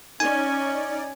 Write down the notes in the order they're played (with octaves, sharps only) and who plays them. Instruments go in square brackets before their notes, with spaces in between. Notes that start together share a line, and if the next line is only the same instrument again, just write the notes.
[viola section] C#4 [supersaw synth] D#4 D5 [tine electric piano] G#5